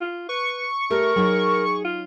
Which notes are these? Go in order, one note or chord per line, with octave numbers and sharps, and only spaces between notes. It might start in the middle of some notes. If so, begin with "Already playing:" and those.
F4
B4 C#6
A3 G4 A#4 E5
F#3 D#4 G#4
F4